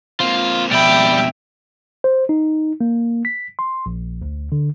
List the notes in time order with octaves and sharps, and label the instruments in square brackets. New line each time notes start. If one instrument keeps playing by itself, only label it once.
[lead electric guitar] A#3 C4 [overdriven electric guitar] F4
[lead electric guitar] F2 B2 [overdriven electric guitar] G3 B5 [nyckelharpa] E5 G5
[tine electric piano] C5
D#4
A#3
B6
C6
A#1
D2
D3